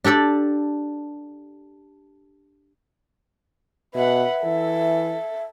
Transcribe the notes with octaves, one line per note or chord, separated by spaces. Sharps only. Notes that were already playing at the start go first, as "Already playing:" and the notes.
D4 G4 A4 D5
B2 B4 E5 F#5
E3 A4